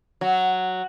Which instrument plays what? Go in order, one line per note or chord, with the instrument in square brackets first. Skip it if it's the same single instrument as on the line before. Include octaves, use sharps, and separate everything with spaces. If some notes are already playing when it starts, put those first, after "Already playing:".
[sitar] F#3